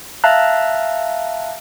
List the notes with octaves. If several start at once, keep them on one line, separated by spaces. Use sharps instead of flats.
E5 F5 A5 A#5 F#6